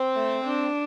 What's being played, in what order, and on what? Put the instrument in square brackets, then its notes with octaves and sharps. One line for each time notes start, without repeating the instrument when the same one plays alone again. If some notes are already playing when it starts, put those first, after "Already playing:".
Already playing: [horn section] C4
[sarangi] A3
D4